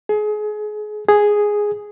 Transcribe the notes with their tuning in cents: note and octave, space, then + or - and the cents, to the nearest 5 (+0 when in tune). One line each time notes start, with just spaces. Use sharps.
G#4 +30
G#4 +0